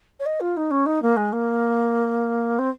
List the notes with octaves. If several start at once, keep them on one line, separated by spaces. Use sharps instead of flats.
C#5
D#5
F4
D#4
C#4
D#4
A#3
G#3
A#3
C4